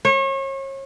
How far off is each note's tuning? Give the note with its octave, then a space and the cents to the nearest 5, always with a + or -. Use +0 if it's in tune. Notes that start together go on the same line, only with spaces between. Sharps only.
C#5 -35